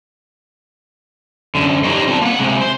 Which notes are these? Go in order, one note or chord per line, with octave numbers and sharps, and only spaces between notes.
F#2 D3
D4 D#4 G4 C5 C#5 D#5
D3 C4 E4 F4 A5
A#3 F#5
C3 G#3
C5